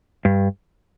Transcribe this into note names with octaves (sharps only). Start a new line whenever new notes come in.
G2